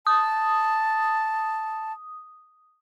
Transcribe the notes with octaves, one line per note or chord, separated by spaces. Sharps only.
A5 D#6